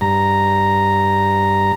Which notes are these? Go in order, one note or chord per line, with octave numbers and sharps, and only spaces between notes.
G2 A#5